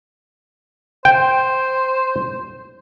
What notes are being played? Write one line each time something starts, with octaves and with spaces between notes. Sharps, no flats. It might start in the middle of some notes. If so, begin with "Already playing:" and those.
C5 G5